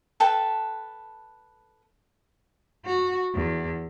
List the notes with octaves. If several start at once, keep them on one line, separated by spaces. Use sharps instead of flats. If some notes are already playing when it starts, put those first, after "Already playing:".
A4 B4 G5 A5
F#4
E2